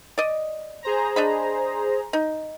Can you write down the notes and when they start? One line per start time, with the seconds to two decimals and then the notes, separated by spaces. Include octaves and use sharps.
0.18 D5 D#5
0.83 G#4 C5 A#5
1.16 D4 D#5 B5
2.13 D#4